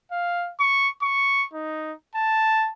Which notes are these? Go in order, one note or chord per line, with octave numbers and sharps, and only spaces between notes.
F5
C#6
C#6
D#4
A5